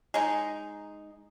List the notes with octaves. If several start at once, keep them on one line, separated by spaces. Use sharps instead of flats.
G#3 D#4